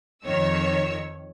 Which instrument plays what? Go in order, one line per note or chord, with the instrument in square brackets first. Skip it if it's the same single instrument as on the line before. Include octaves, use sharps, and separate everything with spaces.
[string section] F2 D#3 C#5 E6